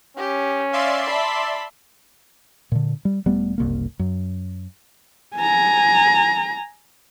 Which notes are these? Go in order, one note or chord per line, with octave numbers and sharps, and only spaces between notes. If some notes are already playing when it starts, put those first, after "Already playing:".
C#4 G4
D5 E5 F5 C6
A5 B5
A#2 D3
G3
E1 G3 A3 B3
F#1 C2 A#3
F#2
G#5 A#5